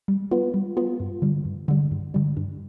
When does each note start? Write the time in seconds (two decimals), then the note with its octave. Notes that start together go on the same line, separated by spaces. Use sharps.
0.08 G3
0.31 B3 F4 B4
0.54 G3
0.77 B3 F4 B4
1.00 G2
1.22 D3 G3
1.45 G2
1.68 D3 G3
1.91 G2
2.14 D3 G3
2.37 G2